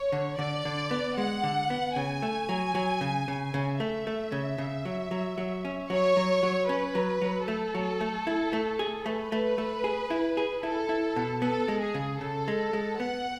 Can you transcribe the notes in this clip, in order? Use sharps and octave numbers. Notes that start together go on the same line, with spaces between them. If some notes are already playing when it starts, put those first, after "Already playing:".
Already playing: C#5
D3
D3 D5
D3
B3
G#3 F#5
D3
B3
C#3 G#5
A3
F#3
F#3
C#3
C#3
C#3 E5
A3
A3
C#3
C#3
F#3
F#3
F#3
C#4
F#3 C#5
F#3
F#3
C#4 B4
F#3
F#3
A3 A4
F#3
A3
E4
A3
G#4
A3 B4
A3
A3
G#4
E4
G#4
E4 A4
E4
B2
B3 A4
G#3
G#4
C#3
C#3 A4
G#3
G#3
B3 F#5